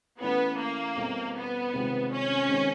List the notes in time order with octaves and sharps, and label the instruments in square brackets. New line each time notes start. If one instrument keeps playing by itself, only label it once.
[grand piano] E3 A3 C#4 E4 [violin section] B3
[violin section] A#3
[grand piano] B2 G3 C4 E4 A4
[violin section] B3
[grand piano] C3 D#3 G#3 C4 F4
[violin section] C#4
[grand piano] D#3 G#3 C4